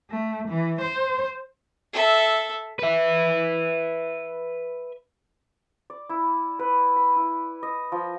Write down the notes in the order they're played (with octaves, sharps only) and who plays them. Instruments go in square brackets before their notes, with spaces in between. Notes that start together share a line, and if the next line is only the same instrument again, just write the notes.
[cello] A3
E3
C5
[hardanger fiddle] A4 E5
[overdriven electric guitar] B4 E5
[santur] D5
E4
B4
B5
E4
D#5
F3